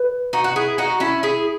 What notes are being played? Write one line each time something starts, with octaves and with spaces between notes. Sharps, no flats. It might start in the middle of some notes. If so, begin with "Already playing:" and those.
Already playing: B4
D#4 F#4
F#4
E4 G#4
D#4 F#4
C#4 E4
E4 G#4